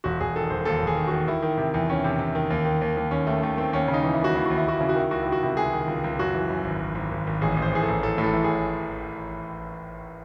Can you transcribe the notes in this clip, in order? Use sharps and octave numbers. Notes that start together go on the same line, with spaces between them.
E1 F#4
E1 G#4
D#3 A4
E1 C5
D#2 A4
E1
G#4
D#3
D#3 F#4
D#3 E4
D#3
C3
E2
D#3 C#4
C3
C3
D#3
D#2
D#3
D#2
D#2
D#3 C#4
D#3 A3
D#3 A3
D#3 C4
D#2 C#4
C#3
D#4
E3
E4
D#2 F#4
D#2 E4
D#2 F#4
E4
D#2 F#4
C#3 E4
F#4
D#3 E4
C#2 F#4
D#3 E4
F#4
C3 E4
C#2 G#4
D#3
C#2
C#2
F#2 F#4
E3
F#2
G#1
G#1
G#1
G#1
G#1
A1 G#4
A1
C5
E3 G#4
A4
A1
A1 A4
A2
A4
E3
G#4